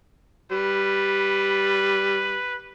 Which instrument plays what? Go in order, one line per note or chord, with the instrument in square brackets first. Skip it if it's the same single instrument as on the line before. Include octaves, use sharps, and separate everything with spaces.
[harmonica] G3 [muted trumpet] B4